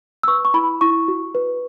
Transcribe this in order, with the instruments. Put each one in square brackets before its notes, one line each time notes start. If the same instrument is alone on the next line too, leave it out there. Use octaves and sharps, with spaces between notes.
[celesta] E6
B4 C#6
C#6
E4 B5
E4 C#6
F#4
B4